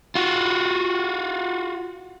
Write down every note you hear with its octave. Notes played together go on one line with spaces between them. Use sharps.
F4 F#4